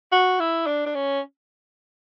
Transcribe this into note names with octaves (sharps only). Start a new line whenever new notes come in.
F#4
E4
D4
D4
C#4